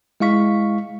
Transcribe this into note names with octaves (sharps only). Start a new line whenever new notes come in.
G#3 E4 F5 C#6 B6